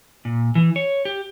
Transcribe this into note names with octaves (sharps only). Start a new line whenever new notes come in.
A#2
E3
C#5
G4